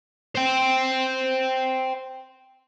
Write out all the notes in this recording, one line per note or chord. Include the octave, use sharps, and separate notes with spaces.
C5 G5